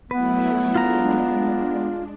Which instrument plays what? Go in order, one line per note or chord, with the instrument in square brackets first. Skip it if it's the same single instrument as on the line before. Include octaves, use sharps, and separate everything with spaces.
[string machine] F#3 A3 E4 [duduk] B3 [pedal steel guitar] B4
[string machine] G#3 D4 [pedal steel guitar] F4 A#5